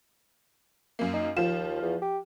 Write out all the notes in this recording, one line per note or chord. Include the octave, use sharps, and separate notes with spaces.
F#2 A#3
D#4
D#2 F3 F4 E7
E2
G4